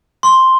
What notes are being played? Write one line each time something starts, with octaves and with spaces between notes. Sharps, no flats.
C6